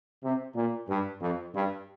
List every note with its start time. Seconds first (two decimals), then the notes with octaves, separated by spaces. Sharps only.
0.23 C3
0.55 A#2
0.88 G2
1.20 F2
1.53 G2